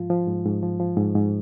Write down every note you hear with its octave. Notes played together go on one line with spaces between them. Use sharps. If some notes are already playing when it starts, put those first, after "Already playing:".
Already playing: G#2 F3 F4
F3
G#2
G#2
F3
F3
G#2
G#2